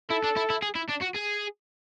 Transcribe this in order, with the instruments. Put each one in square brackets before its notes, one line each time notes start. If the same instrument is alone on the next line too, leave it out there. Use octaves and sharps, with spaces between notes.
[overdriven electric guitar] E4 [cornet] A4
[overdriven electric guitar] D4
E4
E4
G#4
E4
D4
F#4
G#4